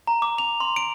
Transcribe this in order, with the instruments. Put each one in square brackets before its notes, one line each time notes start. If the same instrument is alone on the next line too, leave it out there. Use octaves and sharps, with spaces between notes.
[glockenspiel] A#5
D6
F7
C6
D7